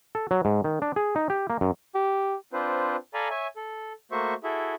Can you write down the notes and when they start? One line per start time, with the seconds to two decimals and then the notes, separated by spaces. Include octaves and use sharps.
0.15 A4
0.31 F#3
0.45 G#2
0.64 D#3
0.82 D4
0.96 G#4
1.16 D#4
1.30 G4
1.50 A#3
1.61 F#2
1.95 G4
2.53 C4 D4 F4 B4 C5
3.14 A4 D5 F5 G#5 A#5 B5
3.30 C#5 E5 G#5
3.56 A4
4.11 A3 A#3 F#4 C5 E5 C#6
4.44 E4 F#4 G#4 A4 E5